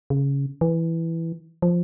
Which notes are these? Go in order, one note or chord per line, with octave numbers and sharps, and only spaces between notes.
C#3
E3
F3